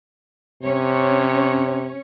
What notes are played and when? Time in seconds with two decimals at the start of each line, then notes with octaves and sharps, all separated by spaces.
0.63 C3 C#4 C#5